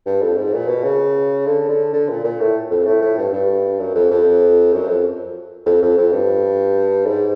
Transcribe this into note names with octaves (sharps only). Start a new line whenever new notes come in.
G2
F2
G#2
A#2
B2
C#3
D3
D3
D3
A#2
A#2
A2
F2
A2
A2
G2
G2
F#2
F2
F2
F#2
F2
F2
F2
F2
G2
G#2